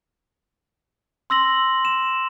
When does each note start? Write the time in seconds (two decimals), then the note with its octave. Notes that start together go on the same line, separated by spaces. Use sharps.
1.30 C6 E6 A#6 F#7
1.85 E7